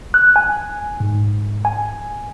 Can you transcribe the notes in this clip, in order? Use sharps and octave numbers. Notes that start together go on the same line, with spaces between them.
F#6
G#5
G#2
G#5